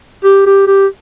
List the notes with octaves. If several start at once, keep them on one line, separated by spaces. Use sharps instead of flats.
G4
G4
G4